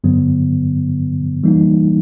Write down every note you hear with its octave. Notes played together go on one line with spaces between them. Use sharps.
G2 D3 F#3 B3
E3 G3 A#3 D#4